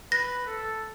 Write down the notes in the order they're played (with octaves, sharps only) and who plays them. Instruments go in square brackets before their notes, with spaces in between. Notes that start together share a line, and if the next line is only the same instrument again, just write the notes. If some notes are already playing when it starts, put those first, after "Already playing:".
[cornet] B4 [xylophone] A#6
[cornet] A4